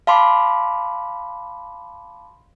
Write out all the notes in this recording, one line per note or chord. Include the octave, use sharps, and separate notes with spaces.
F5 A5 B5 C6 D6